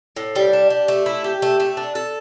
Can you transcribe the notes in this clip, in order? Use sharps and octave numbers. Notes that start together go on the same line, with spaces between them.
A2
G3
D4
G4
A3
E4
G4
A3
A3
D4
A4